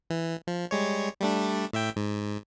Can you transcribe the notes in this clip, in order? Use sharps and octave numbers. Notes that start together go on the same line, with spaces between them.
E3
F3
G3 G#3 C#5
G3 A3 D4
A2 E5 G5
G#2